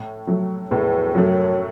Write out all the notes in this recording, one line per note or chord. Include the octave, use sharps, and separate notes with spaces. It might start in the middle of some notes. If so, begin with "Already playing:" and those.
Already playing: A2
F#3 A3
E2 A2
F#2 F#3 A3